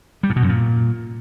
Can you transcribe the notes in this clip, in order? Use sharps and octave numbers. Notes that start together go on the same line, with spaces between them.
G3
A2
B2
F#2
A#2